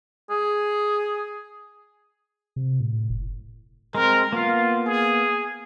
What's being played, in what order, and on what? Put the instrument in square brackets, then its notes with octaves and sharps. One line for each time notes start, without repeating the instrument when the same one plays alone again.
[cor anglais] G#4
[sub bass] C3
A2
F#1
[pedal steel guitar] G#3 C4 [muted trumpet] A#4
[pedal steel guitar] A#3 B3 F5 [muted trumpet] F4
[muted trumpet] G#4